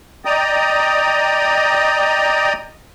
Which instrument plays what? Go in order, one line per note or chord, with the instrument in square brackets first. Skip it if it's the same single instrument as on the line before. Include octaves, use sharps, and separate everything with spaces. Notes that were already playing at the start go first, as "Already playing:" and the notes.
[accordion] D5 D#5 G5 A#5 D#6